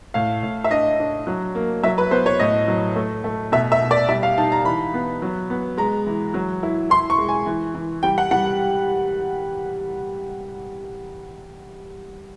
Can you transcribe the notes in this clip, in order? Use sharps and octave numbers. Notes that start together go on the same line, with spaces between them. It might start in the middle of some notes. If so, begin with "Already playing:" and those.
A2 F5
A2
E5
D4 D#5
D4
F#3
A#3
F#3 E5
B4
B3 C5
C#5
A2 D#5
F#3
A3
A3
B2 E5
E5
B2
D5
G3 E5
F5
D#4 A5
A#5
E3 B5
B3
F#3
B3
G#3 A#5
E3
F#3
E4
E4 C6
C#6
G#3
G#5
E3
E3
G3 G5
F#5
G3 F#5